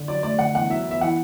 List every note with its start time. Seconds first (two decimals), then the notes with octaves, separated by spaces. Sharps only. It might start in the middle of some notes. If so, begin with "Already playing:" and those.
Already playing: D3
0.08 F#3 D5
0.23 A3 D5
0.39 D3 F#5
0.55 E2 F#5
0.70 F#3 E5
0.86 B3
0.91 E5
1.01 E3 F#5